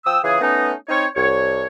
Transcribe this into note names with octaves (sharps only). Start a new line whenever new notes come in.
F3 G5 D#6 E6
C#3 E3 F4 G#4
A3 B3 C#4 D#4
C4 D#4 C5 C#5
C2 C#5